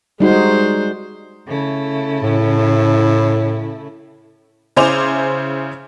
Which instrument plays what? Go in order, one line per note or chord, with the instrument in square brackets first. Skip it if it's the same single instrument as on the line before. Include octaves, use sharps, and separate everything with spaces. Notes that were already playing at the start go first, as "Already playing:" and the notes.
[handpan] G3 D#4 F#4 [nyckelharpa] G#3 C5
[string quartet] C#3 A3 E4
[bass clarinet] A2
[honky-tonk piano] C#3 E4 C5 G#5 D6 F7